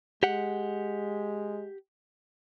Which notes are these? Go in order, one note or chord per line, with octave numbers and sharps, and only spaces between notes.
G#3 G4 F#5